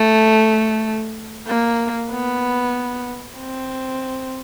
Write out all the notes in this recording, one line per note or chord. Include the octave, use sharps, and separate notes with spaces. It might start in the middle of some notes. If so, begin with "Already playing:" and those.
Already playing: A3
A#3
B3
C4